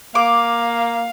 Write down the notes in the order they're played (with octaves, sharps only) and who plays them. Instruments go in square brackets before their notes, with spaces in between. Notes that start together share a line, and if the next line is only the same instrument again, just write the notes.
[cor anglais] A#3 [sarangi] F5 [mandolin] D6